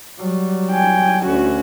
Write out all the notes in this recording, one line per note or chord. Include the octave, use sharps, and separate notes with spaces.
F#3 G3
G5 G#5
D2 C#4 F#4